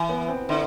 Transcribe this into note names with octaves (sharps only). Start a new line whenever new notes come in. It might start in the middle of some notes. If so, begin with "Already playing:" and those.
Already playing: E3
B3
C4
D3 E4